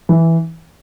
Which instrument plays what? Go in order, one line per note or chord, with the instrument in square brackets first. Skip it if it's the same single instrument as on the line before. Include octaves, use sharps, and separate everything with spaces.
[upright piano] E3